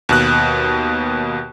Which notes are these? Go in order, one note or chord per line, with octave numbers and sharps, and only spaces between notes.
D#2 B2 F#6